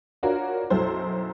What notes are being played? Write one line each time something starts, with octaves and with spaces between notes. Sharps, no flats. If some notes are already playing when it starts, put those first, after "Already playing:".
D4 F4 F#4 A#4 C#5
B1 F#2 E4 A4 C5